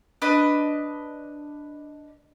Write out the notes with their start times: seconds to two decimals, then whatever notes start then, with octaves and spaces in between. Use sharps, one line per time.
0.22 D4 B4 D#5